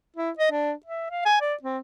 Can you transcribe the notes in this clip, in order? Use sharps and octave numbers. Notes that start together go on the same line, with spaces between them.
E4
D#5
D4
E5
F5
G#5
D5
C4